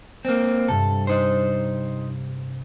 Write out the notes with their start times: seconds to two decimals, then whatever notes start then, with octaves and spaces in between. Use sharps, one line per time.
0.25 A#3 C4
0.68 G2 C3 A4
1.07 D#4 C5